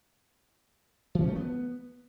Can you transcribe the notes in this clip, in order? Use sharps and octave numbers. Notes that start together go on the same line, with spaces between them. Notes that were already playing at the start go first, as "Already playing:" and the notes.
E3
C#4
A3
B3